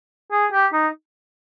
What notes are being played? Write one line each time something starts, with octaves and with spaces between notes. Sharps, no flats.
G#4
G4
D#4